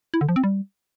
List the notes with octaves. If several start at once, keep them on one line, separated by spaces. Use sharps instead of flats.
E4
D3
F3
C4
G3